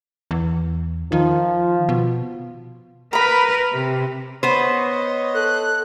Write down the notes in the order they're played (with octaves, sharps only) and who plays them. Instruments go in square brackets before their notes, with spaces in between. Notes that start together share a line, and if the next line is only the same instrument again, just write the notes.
[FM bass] E2
[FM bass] D#3 [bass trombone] F3
[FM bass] B2
[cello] A#4 B4 [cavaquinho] A#5 B5
[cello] C3
[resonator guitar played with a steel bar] B3 C5 [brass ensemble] C#5 D#5
[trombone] A4 [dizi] F#6